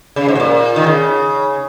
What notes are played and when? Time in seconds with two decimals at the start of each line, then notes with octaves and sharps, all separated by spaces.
0.16 C#3
0.28 G#2
0.35 C3
0.40 A#2
0.76 D#3
0.86 C#3